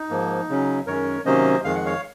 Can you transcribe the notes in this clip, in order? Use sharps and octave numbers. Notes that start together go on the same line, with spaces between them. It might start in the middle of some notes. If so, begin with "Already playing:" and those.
Already playing: D#4
G#2 F3 A#3
C#3 F#3 C#4
F#2 D#3 G#3 C#4 A#4 C#5
C3 D#3 F#3 A#3 C#4 C5 D#5
F2 D#3 G#3 F5
F#5
C#5 F5